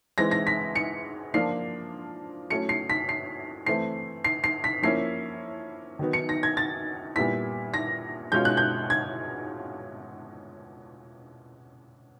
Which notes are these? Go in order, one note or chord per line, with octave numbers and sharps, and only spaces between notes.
E3 G#3 C4 E4 A#6
A#6
B6
C#7
F3 A#3 D4 F4 C7
F#3 A3 C#4 E4 C#7
C7
B6
C7
E3 A3 C4 C7
C7
C7
B6
F3 A#3 C#4 E4 C7
D#3 F#3 B3 D#4
C#7
A#6
G#6
A6
A#2 G3 B3 E4 B6
A#6
B2 G#3 C#4 F4 G6
F#6
G6
G#6